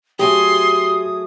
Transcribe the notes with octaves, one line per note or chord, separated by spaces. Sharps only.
F#3 A3 G4 G#4 C6 D#6